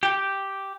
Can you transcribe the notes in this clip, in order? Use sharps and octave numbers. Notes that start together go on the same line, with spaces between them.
G4